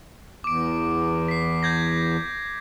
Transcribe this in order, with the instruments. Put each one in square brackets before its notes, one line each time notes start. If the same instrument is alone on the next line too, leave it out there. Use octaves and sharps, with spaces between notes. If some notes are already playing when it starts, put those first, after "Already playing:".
[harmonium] E2 [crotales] D6 D7
[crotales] B6 C7
G6 G#6 A#6